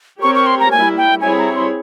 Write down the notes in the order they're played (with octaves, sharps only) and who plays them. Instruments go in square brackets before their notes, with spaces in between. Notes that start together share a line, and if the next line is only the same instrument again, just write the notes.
[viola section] C4 G4 A#4 C#5 [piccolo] C#6
[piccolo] C#6
C6
A#5
[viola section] G3 A#3 E4 [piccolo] G#5
[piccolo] G5
[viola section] G3 C4 E4 G#4 C#5 [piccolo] G#5
[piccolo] A#5
C6